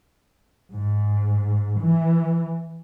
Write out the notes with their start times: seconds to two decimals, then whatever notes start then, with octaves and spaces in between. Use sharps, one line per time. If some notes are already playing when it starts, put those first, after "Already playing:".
0.72 G#2
1.80 E3